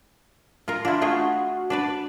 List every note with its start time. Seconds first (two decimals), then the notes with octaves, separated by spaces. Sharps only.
0.68 F4 A#4
0.85 D4 E4 F4
1.01 A3 F4 F#4 G#4
1.70 D4 B4 D5